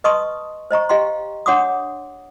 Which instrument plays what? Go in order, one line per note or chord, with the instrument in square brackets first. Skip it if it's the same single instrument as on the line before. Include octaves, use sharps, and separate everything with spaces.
[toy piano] B4 D#5 A5 C6 C#6 D#6
C5 D#5 A#5 C#6
G4 D#5 F5 G5 A#5 C6
D4 C#5 F#5 C6 D6 D#6